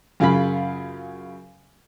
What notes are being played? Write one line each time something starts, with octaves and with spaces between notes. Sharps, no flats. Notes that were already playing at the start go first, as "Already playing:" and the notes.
F#2 C#3 F4 G#4 F5 B5